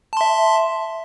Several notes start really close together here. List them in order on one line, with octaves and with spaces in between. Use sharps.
A5 C6 E5